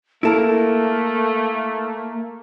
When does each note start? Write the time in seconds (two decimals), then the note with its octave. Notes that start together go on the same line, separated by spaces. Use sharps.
0.23 A3 A#3 E4 A4 A#4